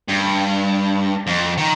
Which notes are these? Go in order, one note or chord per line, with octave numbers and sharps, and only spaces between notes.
G2
F2
D#3